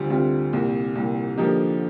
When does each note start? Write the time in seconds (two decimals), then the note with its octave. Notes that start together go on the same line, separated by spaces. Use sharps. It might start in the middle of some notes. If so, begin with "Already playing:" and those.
Already playing: D2 C3 G3 C4 F4
0.10 D2 C3 G3 C4 F4
0.53 C2 A#2 G3
0.95 C2 A#2 G3
1.37 D3 F3 A#3 D#4 G4